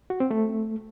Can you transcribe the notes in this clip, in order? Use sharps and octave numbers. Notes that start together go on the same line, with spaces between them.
F#4
C4
A3